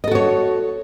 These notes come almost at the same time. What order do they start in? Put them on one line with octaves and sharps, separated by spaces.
D#5 A4 F#4 C#5